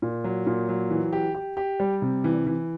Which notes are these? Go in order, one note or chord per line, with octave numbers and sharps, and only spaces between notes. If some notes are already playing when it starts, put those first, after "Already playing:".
A#2
F#3
A#2
F#3
E3
G4
G4
G4
G3
C3
E3
E3